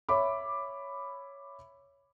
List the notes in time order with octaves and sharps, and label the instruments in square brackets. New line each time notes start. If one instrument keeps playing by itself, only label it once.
[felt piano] C#5 E5 B5 D6